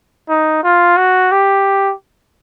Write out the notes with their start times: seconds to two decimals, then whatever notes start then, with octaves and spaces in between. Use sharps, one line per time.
0.29 D#4
0.63 F4
0.97 F#4
1.31 G4